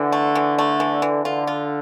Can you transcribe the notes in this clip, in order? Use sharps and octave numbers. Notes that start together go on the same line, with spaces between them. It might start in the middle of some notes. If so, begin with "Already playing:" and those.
Already playing: D3 E3
A3
E3
A3
E3
E3
D3 F4
F4